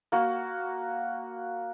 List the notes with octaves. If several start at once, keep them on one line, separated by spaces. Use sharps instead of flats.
A#3 F#4